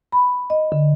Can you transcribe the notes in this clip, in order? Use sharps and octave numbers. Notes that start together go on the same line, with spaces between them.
B5
D#5
D3